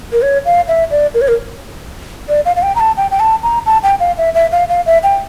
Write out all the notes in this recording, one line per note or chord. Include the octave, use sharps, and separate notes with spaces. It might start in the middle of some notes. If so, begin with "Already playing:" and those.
A#4
C#5
F5
E5
D5
A#4
C#5
A#4
D5
F5
F5
G5
A#5
A5
G5
G5
A5
A#5
A5
G5
F5
E5
E5
F5
F5
E5
G5